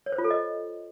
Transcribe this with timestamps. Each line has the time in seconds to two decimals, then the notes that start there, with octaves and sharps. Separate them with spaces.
0.06 C#5
0.12 C5
0.18 F4
0.24 A4
0.30 D#5